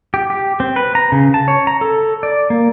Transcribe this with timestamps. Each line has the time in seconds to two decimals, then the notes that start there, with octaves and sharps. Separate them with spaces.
0.14 G4
0.30 G4
0.60 C4
0.76 B4
0.95 A#5
1.12 C#3
1.34 A5
1.48 C#5
1.67 A#5
1.81 A4
2.23 D5
2.50 A#3